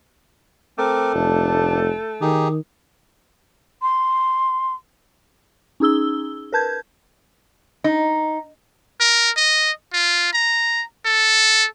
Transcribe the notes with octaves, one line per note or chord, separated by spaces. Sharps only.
A3 C4 A#4 D6
F1 D4
D#3 D#4 G4 G#4
C6
C#4 D#4 G#4 E6 G7
A#4 B4 A5 G6 G#6
D#4
A#4
D#5
F4
A#5
A4